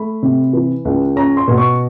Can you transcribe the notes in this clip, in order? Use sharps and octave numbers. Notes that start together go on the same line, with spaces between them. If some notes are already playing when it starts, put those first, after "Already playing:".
Already playing: A3 B5
C3
E3
C#2
C#4 A#5
C6
B2
C#6